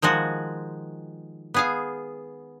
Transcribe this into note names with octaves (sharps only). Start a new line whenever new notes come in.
D#3 F3 G#3 F#4
B3 G#4 F5